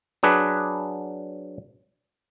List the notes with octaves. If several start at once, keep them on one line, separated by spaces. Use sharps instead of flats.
F#3 D4 G#4 B4